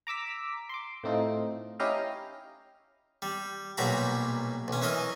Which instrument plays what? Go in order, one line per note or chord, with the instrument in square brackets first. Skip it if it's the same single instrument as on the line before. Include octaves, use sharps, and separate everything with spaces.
[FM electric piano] A#5 D6 E6 B6
C6 D6
A2 A3 C4 D#4 F4
C#4 D#4 E4 G4 D#5 F5
[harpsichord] G3
B1 A#2 F#3 G3 A#5 B5
B1 C#4
E3 C#4 A#4 D#5